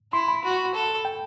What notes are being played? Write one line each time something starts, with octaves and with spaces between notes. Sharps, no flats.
E4 C6
B5
F#4
A4
G5